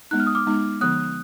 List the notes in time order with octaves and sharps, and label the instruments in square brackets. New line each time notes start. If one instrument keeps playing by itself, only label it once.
[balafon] G#3 B3 D#4 [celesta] F#6
[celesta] F6
D#6
D6 F6
[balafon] G#3 B3 D#4
[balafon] D3 F3 B3 [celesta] D#6 F#6